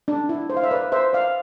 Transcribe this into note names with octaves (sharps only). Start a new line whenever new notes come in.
D4
E4
C5
F5
E5
B4 D5
C5 E5
D5 F5